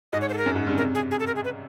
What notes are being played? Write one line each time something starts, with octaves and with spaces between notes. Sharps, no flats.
G#2 D#5
C#5
C5
A4
A#4
F#2
G#2
G2
C#3
C3 A#4
G#4
G#4
A4
A#4
G#4
B4